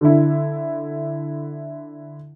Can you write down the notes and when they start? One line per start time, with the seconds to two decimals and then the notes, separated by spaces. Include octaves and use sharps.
0.01 D3 D4 E4